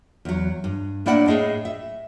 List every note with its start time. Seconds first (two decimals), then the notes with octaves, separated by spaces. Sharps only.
0.25 E2 F#3
0.64 G2
1.06 A2 A#3 D4 E4 D5 F#5
1.28 A2 G#4 D#5
1.65 E5